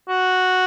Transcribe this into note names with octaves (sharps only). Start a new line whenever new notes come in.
F#4